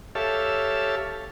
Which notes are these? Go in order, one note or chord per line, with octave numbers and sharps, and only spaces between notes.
G4 A4 C#5 E5 F5 A5